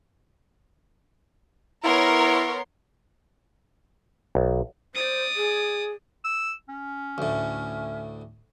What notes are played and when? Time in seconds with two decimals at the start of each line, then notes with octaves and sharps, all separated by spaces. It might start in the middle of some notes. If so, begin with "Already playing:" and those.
1.84 B3 E4 A#4 C#5 C6
4.35 B1
4.95 C5 D5 D#6
5.36 G#4
6.25 E6
6.69 C#4
7.18 D2 A2